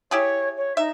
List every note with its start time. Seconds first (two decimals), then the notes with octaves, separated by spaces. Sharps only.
0.11 E4 G4 G#4 C#5
0.57 C#5
0.77 D#4 E5